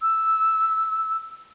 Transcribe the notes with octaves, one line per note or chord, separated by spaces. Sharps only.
E6